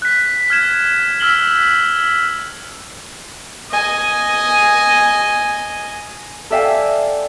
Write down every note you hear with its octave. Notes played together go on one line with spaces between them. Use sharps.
F#6 B6
F6 G#6 E7
E6 F6 B6 F#7 G7
D#5 G#5
A4 D5 E5 F5 G5 G#5